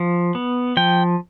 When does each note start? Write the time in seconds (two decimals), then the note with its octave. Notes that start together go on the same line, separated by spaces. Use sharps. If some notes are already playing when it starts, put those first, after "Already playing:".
Already playing: F3
0.35 B3
0.77 F3 G5